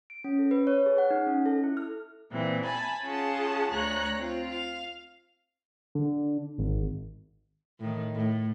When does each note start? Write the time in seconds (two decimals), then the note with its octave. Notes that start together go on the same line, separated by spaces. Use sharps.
0.10 D7
0.24 C#4
0.39 A4
0.51 B4
0.67 C#5
0.86 G#4
0.98 F#5
1.10 D#4
1.27 C#4
1.46 A4
1.64 E4
1.77 F6
2.31 A#2 E3 C4
2.64 G#5 A5 B5
3.03 C#4 F4 G#4 F#5 A5
3.72 D2 C#5 A#5 F#6
4.17 C4 F4
4.51 F5
5.95 D3
6.58 G#1
7.80 A2 D#3
8.15 A2